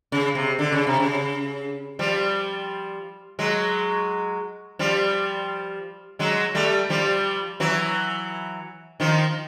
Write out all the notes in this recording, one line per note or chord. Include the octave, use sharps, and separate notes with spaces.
C#3
C3
D3
C#3
C3
C#3
F3 G3
F#3 G#3
F3 G3
F#3 G#3
G3 A3
F3 G3
E3 F#3
D#3 F3